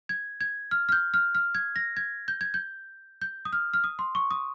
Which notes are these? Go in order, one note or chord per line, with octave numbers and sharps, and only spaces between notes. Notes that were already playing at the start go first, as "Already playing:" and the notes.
G#6
G#6
F6
F6
G6
F6
F6
G#6
A#6
G#6
G6
G#6
G6
G6
D#6
F6
F6
D#6
C6
C#6
D#6